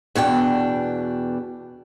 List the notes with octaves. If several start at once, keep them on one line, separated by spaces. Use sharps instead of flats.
E2 B2 D4 G5